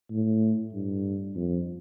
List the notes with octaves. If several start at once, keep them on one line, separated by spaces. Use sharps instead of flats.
A2
G2
F2